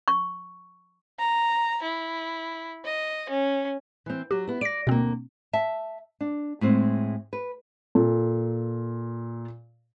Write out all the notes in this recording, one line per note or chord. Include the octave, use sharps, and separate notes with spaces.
C#6
A#5
E4
D#5
C#4
E3 C4
F#3 F#4 G4
B3 E4
D5 A#6 D7
D2 B2 A#3 C4
E5 A5
D4
A2 G#3 C4
B4
A#2 A4